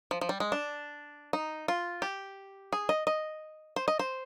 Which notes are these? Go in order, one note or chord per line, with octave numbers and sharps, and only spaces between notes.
F3
F3
G3
G#3
D4
D#4
F4
G4
G#4
D#5
D#5
C5
D#5
C5